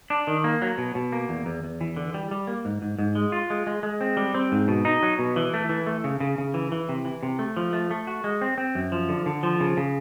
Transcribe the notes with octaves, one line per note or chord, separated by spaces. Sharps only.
D4
D#3
A#3
F#3
B2
B2
A#3
E2
E2
E2
E3
D3
G3
G3
A#3
G#2
G#2
G#2
G#3
F4
G#3
G#3
G#3
C4
G3
C4
G#2
B2
D#4
F#3
B2
E3
A3
E3
A3
C#3
C#3
C#3
E3
E3
C3
E3
C3
A3
F3
A3
A3
F#4
G#3
C4
C4
F#2
F3
D3
D3
F3
C#3
C#3